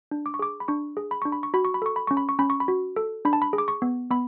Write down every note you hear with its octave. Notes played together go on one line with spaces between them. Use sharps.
D4
D6
C#6
G#4 D6
B5
D4 C#6
G#4
B5
D4 C#6
B5
C#6
F#4 B5
C#6
B5
A4 C#6
B5
C#4 C#6
B5
C#6
C#4 B5
C#6
B5
F#4
A4
D4 B5
A5
B5
G#4
D6
C#6
B3
B3 B5